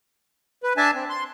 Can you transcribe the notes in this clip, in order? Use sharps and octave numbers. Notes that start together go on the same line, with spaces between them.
B4
D4 E5 G#5 A5
C4
C6